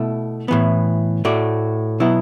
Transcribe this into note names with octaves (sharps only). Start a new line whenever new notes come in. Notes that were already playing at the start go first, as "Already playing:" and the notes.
Already playing: B2 A3 E4
A2 E3 B3
A2 A3 F#4 D5
B2 F#3 B3 E4